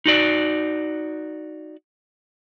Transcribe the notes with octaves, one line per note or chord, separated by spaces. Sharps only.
D#4 F#4 D5